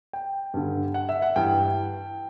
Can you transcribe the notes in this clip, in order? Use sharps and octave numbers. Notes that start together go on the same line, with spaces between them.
G5
G2 D3
F#5
E5
F#5
G2 E3 G5